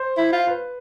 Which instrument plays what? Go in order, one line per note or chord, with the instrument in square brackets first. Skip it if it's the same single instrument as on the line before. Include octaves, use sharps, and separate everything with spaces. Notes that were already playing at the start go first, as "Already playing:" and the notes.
Already playing: [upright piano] C5
[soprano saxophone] E4
F4
[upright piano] B4